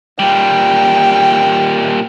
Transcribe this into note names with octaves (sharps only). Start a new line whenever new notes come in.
A#2 G3 G5